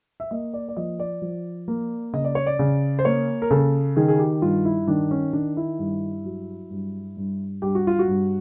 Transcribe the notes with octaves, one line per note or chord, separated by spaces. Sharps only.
E5
A#3 D#5
D5
D5
F3 D#5
D5
F3
A#3
C#3 D#5
D5
C#5
D5
C#3
C5
A#3 C#5
A#4
C#3 A4
D#3 G#4
G#4
G4
G2 F4
E4
D#3 D4
C#4
D#3 D4
E4
G2
F#3
G2
G2
G2 G4
F#4
F4
F#4
G2